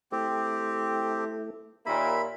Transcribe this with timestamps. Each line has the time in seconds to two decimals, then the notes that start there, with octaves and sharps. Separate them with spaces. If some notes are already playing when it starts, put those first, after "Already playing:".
0.12 A3 C4 E4 G4 A4
1.86 D#2 A#2 A#3 E5 B5